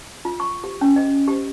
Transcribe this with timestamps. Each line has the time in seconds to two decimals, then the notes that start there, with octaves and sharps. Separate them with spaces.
0.25 F4
0.40 C#6
0.64 G4
0.81 C#4
0.96 D#5
1.28 G4